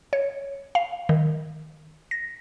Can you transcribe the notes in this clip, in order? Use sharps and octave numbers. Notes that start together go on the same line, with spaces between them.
C#5
F5
D#3
A#6